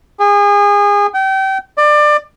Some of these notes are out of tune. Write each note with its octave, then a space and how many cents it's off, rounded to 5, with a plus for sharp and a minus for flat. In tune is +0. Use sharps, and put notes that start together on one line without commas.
G#4 -30
G5 -30
D5 +25